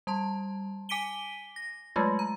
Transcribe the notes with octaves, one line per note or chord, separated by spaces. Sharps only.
G3 A5 C6
G#5 D6 B6 D7 D#7 G7
A#6
F#3 G#3 A3 F4
A#5